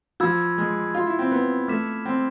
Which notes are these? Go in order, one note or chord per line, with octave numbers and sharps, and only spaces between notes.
F3 B5 E6 G#6
G#3
F4
E4
C4
B3
A3 D6 F6 B6 E7
C4